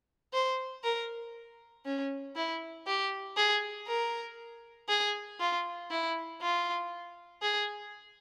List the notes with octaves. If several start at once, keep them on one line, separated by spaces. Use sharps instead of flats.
C5
A#4
C#4
E4
G4
G#4
A#4
G#4
F4
E4
F4
G#4